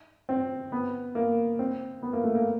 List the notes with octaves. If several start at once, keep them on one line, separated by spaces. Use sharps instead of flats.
C4
B3
A#3
C4
B3
A#3
A3
A#3